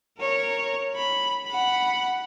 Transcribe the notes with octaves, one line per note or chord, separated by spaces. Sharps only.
A#4 C#5
B5
F#5 B5